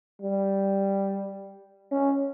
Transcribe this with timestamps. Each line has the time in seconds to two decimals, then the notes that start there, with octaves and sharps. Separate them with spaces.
0.22 G3
1.92 C#4